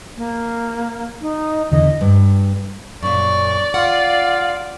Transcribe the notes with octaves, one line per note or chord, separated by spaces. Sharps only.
A#3
D#4
E2 D3 E3 D#5
G2
F#2 A#2 D5 C#6
F4 F5 F#5